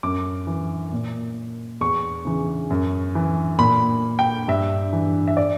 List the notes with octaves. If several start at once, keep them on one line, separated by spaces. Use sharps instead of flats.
F#2 D6
E3
A#2
E2 C#6
C#3 E3
F#2
E3
A#2 B5
G5
G2 E5
E3
E5
D5